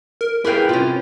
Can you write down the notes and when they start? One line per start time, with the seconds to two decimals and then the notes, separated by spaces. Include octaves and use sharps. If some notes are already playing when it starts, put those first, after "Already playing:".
0.21 A#4
0.44 E4 G4 G#4 A#4 B4 F5 G5
0.69 C3 C#4 F4